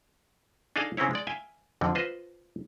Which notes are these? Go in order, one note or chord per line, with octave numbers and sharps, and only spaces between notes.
D4 D#4 G#4 A4 D#5 F5
C#3 C4 C#4 E4 C#5
G#3 D5
E5 F5 G5 G#5
F2 D3 F3
F4 B4 C5 D#5